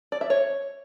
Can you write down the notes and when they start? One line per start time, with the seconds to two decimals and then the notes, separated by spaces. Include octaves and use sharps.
0.12 D5
0.21 E5
0.30 C#5